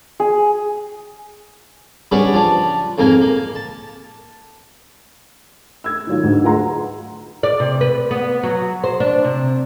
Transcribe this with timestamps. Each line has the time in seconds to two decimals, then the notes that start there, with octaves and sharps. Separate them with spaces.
0.20 G#4
2.12 G3 C#4 D4 G#4 B4 F#5
2.34 F3 D4
2.98 F2 G#2 A#3 A#4 G#5
3.21 A#3
3.55 A5
5.84 E6 G#6
6.07 D#3 F#3 F4
6.24 D2 G#2
6.43 F4 G#4 B4 F#5 A#5 C6
7.43 D5
7.60 C3
7.81 B4
8.11 B3
8.43 F#3
8.84 C5
9.00 D4
9.24 C3